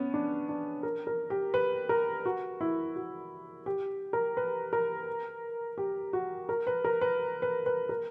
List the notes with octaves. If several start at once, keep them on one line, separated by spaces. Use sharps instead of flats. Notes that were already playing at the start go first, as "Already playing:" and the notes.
Already playing: B3 C#4
D4
D4
A#4
A#4
G4
B4
A#4
F#4
E4
F#4
G4
A#4
B4
A#4
G4
F#4
A#4
B4
A#4
B4
B4
B4
A#4